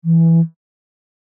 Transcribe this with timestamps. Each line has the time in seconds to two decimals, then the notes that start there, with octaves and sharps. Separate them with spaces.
0.05 E3